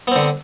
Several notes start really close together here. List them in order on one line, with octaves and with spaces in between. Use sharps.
B3 C4 D3